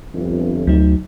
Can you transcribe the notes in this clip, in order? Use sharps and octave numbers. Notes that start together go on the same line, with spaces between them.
G1 F2
D2 F#3 D#4